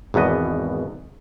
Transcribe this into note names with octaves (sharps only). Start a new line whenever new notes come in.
G#1 E2 B2 B3 D#5